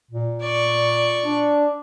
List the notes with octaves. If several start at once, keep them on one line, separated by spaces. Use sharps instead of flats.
A#2
D5 C#6
D4